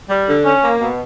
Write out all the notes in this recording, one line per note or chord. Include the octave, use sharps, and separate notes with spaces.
G3
D3
C#4
A#3
B2